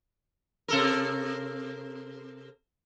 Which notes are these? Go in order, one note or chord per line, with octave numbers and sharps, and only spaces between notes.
C3 A4 A#4